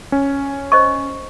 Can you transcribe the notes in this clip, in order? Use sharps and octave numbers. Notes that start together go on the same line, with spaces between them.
C#4
C5 D#5 C#6